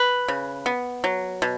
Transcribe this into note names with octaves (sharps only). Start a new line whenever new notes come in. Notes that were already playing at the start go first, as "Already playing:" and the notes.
Already playing: B4
C#3
B3
F#3
B2